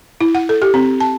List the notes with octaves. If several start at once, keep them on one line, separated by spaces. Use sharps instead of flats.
E4
F#5
A4
G4
C4
A5